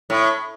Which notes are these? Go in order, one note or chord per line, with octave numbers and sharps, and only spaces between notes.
A2